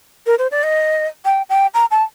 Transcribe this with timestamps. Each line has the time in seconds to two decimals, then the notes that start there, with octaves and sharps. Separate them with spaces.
0.27 A#4
0.39 C5
0.51 D5
0.63 D#5
1.25 G5
1.50 G5
1.74 A#5
1.91 A5